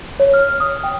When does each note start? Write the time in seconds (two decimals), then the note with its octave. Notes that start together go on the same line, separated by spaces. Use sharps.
0.20 C#5
0.34 F6
0.60 D#6
0.84 G5